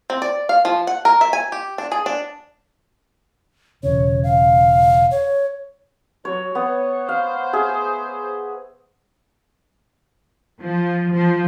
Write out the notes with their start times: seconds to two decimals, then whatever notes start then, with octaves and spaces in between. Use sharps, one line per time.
0.10 C4
0.22 D5
0.49 F5
0.65 F3
0.87 F#5
1.05 A#4
1.21 E5
1.33 G#5
1.52 G4
1.78 D4
1.92 G#4
2.06 D4
3.83 E1 C#3 C#5
4.23 F5
5.11 C#5
6.25 F#3 C#5
6.55 B3 C#5
7.09 C5 F5
7.53 G#4 E5
10.61 F3
11.13 F3